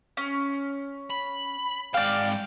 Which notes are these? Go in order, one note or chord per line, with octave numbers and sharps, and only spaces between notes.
C#4
B5
G#2 D5 F5 G5